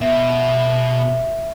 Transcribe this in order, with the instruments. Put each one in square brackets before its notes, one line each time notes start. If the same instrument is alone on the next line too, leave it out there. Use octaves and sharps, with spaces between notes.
[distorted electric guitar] B2 [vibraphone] E5